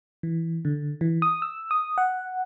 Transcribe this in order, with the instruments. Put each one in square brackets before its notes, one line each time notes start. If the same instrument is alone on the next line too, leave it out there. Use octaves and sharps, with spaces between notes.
[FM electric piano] E3
D3
E3
D#6
E6
D#6
F#5